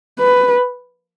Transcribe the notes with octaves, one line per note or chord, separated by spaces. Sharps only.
B4